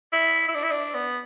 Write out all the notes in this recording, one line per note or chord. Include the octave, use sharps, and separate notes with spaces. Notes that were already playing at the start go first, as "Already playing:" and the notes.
E4
E4
D4
E4
D4
B3